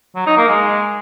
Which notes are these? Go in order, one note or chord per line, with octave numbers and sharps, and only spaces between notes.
F#3
D#4
A#3
G#3